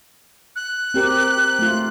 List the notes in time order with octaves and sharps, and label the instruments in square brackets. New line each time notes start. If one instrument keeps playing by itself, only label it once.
[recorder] F#6
[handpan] C4 G4 A#4
A3 F4